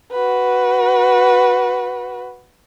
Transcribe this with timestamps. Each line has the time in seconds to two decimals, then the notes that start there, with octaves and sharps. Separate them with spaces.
0.12 F#4 B4